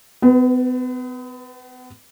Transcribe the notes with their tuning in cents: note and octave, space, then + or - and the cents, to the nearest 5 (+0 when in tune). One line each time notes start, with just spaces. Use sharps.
B3 +40 B4 -5